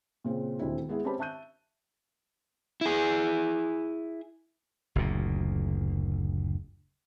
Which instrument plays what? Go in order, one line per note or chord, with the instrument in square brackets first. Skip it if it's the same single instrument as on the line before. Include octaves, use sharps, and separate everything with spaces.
[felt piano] A#2 C#3 C4 F4
D#1 D2 C4 E4
G#3 B3 E4 G#4 E5
C4 C#4 G4 B4 A5 B5
E5 A5 C#6 F#6 G6 D#7
[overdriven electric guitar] E4 G#4
[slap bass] F#1 D2 A#2